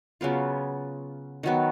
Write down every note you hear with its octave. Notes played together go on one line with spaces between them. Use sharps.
C#3 F#3 B3 F4
D#3 F#3 B3